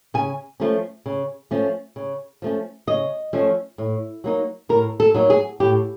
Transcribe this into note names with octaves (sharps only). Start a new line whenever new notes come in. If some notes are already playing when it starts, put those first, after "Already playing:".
C#3 G#5
F3 A3 C#4
C#3
F3 A3 C#4
C#3
F3 A3 C#4
C#3 D#5
F3 A3 C#4
A2
F#3 A#3 D#4
A2 A#4
A4
F#3 A#3 D#4
G#4
A2 G4